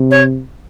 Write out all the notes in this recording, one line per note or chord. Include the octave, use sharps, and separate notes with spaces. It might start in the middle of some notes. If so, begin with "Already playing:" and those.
Already playing: C3
C#5